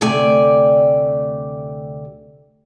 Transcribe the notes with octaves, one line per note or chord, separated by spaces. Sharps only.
D2 C3 A3 G4 D5 G#5